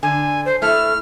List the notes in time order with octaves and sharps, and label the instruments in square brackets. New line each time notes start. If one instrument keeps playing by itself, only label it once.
[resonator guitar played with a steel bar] D3 [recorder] G#5
[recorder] C5
[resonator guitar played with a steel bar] A3 E4 A4 [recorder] F6